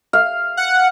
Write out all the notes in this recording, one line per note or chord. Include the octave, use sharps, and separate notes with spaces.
F5
F#5